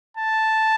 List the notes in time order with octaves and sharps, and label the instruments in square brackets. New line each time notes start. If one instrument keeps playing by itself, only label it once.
[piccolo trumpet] A5